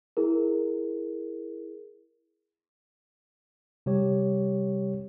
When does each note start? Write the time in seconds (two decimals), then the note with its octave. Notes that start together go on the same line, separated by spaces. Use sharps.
0.17 E4 G#4 A#4
3.86 C3 G3 G4 C#5